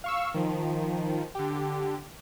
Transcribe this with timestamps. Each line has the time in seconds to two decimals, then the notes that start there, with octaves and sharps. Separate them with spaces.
0.04 F5 C#6 E6
0.34 D#3 F3
1.35 D3 G4